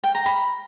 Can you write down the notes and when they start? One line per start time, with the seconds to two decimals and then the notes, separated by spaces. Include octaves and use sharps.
0.04 G5
0.15 A#5
0.26 B5